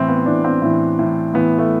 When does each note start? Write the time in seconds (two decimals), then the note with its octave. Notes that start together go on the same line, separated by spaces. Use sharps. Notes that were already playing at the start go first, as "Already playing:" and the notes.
Already playing: A2 E3 C4
0.08 B3
0.26 A2 E3 D4
0.44 C4
0.62 A2 E3
0.99 A2 E3
1.34 A2 E3 B3
1.59 A3